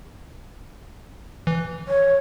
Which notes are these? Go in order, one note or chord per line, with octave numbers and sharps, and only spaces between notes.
E3
C#5